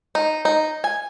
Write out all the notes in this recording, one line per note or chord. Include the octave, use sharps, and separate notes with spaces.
D#4
D#4
G#5